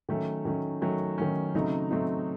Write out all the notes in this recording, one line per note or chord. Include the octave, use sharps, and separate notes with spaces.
D#3 F#3 A3 C#4
D#3 F#3 A3 C#4
D#3 F#3 A3 C#4
D#3 F#3 A3 C#4
C#3 F#3 A3 C4 D#4
C#3 F#3 A3 C4 D#4